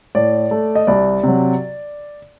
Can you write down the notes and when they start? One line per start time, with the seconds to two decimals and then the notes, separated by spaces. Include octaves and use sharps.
0.15 A2 D5
0.51 A3
0.75 D#5
0.87 C2 D5
1.23 C3 F#3